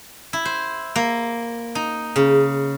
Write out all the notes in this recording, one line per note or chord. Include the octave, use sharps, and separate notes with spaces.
E4
C5
A#3
D#4
C#3